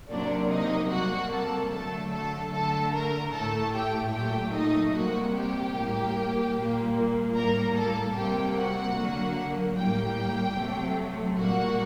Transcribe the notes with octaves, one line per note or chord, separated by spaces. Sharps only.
C3 F#3 A#3 D4 D5
D#4 D#5
C3 G3 A#3 F#4 F#5
A4 A5
D3 F#3 A3 A4 A5
A4 A5
D3 A3 A4 A5
A#4 A#5
A2 A3 A4 A5
G4 G5
A#2 F#3 A3 G4 G5
D#4 D#5
C3 G3 A#3 F#4 F#5
G4 G5
A2 G3 A#3
A#2 G3 A#3
A2 G3 A#3 A#4 A#5
A4 A5
C3 G3 A#3 G4 G5
F#4 F#5
D3 F#3 A#3
A2 G3 A#3 G4 G5
C3 F#3 A3
A#2 G3 A#3 F#4 F#5